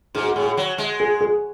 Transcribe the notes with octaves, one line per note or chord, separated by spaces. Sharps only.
G#2 G#4
F#4
G#4
A2
G#4
F#3
G#3
G#4
G#4